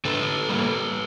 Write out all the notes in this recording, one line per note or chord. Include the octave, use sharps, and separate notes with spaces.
D3 A4 B4
G3 A#3